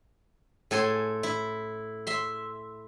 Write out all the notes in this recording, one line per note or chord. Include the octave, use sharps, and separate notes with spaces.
A2 A4 G#5 C6
E4
E5 C6